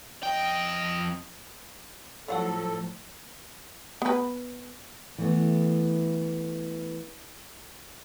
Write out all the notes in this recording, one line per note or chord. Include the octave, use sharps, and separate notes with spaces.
F2 D#5 G5
A2 F3 F#3 C#4 A4 F5 F#5
B3 B4
E3 A3 B3